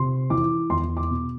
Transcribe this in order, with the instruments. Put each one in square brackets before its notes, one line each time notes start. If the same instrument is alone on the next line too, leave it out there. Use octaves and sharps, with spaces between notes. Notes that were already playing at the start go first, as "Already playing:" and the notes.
Already playing: [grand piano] C3 C6
E3 D6
E2 C6
D6
B2